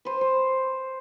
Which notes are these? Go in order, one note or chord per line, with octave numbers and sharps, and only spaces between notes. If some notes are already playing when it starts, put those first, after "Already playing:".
B4 C5
C5